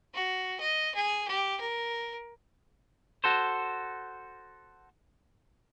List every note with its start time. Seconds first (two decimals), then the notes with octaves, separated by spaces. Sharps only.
0.14 F#4
0.60 D#5
0.95 G#4
1.28 G4
1.60 A#4
3.24 F#4 A4 C5